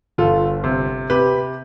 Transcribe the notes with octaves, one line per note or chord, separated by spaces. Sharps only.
G1 F4 A4
C3
C3 G4 B4